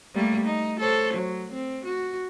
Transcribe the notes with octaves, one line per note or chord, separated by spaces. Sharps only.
G3 A3 A#3
D#4
A4 C5 C#5
F#3
C4
F#4